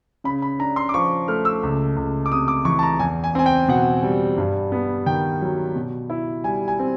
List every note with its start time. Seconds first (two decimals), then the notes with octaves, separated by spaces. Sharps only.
0.24 C#3 B5
0.42 B5
0.59 D4 A#5
0.76 C6
0.89 D6
0.94 F3 C#6
1.28 A3 F6
1.45 E6
1.63 C#2
1.97 C#2
2.26 D6
2.31 C3 D#6
2.48 D6
2.65 E3 C#6
2.79 A5
2.83 A#5
2.99 E2 G#5
3.24 G#5
3.35 C4 G#5
3.46 G5
3.68 B2 F#5
4.03 G3
4.38 G2
4.72 B3
5.06 D#3 G5
5.42 F#3
5.76 B2
6.10 E4
6.44 G3 G#5
6.68 G#5
6.79 C4